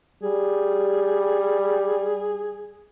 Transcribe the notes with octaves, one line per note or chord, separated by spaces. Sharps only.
G3 G#4